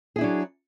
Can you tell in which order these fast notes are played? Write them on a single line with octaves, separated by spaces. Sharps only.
G#4 E4 D4 F#3